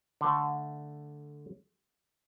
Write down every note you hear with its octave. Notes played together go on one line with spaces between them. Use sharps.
D3 A3